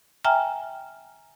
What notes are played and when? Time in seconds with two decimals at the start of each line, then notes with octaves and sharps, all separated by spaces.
0.24 E5 G5 G#5 A#5 F6